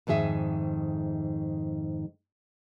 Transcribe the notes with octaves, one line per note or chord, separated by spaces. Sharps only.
F2 G#2 D#3 G#4 E5